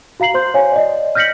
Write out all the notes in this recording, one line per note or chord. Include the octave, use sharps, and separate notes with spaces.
F#4 F5 A#5 C7 F#7
C5 C6 G6
C#5 F5 G#5
D5 D#5
F6 G6 A#6 B6 C#7 F#7